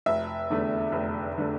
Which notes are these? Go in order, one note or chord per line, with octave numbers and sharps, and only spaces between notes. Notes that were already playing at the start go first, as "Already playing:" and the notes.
F1 E5
E2 D3 A3
F1
D3 A3